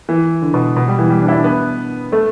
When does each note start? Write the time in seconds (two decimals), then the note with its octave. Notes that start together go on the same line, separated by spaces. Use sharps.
0.09 E3
0.42 D3
0.54 B2
0.76 B2
0.88 G3
0.99 E3
1.10 G3
1.22 D4
1.28 E4
1.32 D4
1.44 B3
2.12 A3